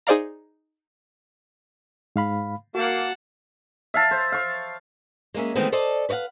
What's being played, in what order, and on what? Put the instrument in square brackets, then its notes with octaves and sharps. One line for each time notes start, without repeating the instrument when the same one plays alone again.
[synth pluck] D#4 G#4 C5 D5 F5 A#5
[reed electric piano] G#2 F5 B5
[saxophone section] A#3 [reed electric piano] F#4 [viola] F#5 A5
[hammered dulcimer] E5 F5 A5
C5
F5 C#6
[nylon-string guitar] G#3 A#3 C#4 E5
D#3 E3 G#3 A3 B3 C4
A4 C5 D5 D#5 A5
B4 C#5 D#5 F5 F#5